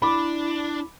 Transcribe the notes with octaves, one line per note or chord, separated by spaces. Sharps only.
D4 E4 B5 D6